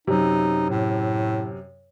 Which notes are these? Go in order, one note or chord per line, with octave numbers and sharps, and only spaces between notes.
F#2 C3 D#4
A2